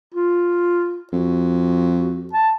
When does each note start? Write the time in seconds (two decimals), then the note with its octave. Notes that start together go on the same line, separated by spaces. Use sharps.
0.14 F4
1.13 F2 F#4
2.33 A5